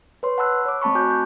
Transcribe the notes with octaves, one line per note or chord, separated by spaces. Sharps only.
B4 C#5 C6
F#5 A5 B5 E6 F#6
C#5 D6
A3 C4 A5 B5 C#6
F#4 G#5 A5 D6 F#6 G6
G6